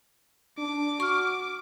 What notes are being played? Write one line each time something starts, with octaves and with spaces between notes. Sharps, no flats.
D4 D6
F#4 C#6 F6